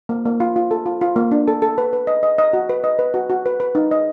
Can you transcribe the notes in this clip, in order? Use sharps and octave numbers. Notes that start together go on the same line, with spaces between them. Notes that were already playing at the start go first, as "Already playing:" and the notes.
A#3
A#3
F4
F4
A4
F4
F4
A#3
D4
A4
A4
B4
B4
D#5
D#5
D#5
F#4
B4
D#5
B4
F#4
F#4
B4
B4
D#4
D#5